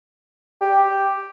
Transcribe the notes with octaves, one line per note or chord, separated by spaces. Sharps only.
G4